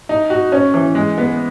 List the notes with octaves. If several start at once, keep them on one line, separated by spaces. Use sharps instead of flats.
D#4
F#4
C#4
E3
G#3
B3